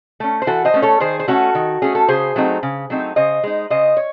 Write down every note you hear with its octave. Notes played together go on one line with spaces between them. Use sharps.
A3 C#4
C5
E3 F#4 A4
C5 D#5
A3 C#4
A4 C#5
D#3 G#4 C5
C5
A3 C#4 F#4 A4
D#3
A3 C#4 G#4
A4
C#3 G#4 C5
F#3 A3 C4 D#4
C#3
F#3 A3 C4 D#4
C#3 C5 D#5
G#3 D#4
C#3 C5 D#5
C#5